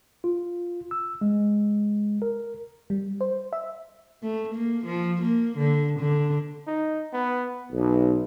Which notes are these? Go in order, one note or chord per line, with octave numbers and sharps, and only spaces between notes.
F4
E6
G#3
A#4
G3
C5
E5
A3
A#3
F3
A#3
D3
D3
D#4
B3
B1